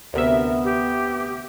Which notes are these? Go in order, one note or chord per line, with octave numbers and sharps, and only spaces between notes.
D2 C3 B3 A#4 E5
G4